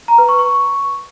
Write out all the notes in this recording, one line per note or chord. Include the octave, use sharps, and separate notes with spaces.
A#5
B4
C#6
C#6